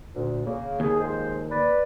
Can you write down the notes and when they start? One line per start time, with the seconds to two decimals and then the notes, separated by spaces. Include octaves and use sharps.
0.14 D2 A#2
0.45 C#3 A#3
0.80 D#2 G#4
1.00 F3 G#3 C5
1.50 B4 D5